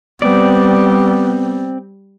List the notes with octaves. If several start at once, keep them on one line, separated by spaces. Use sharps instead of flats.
G3 B3 C4 D5